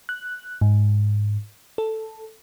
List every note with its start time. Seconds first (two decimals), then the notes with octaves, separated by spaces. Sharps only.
0.09 F#6
0.61 G#2
1.78 A4